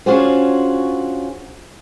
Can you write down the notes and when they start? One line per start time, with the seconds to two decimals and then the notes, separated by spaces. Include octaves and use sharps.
0.06 C#4 D4 F4 F#4 G#4 C5